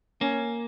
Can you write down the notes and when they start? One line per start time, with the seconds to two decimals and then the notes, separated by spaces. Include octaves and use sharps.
0.21 A#3 C#4